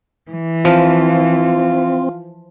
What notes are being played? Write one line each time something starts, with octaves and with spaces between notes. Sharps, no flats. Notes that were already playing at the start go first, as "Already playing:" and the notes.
E3
F3 C4 F4